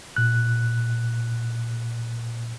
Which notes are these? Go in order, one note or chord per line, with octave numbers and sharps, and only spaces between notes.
A#2 F#6